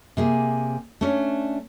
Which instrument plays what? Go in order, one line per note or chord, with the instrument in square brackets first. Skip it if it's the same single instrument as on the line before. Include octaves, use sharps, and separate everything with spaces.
[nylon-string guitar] C3 A#3 G#4
A3 C#4 D4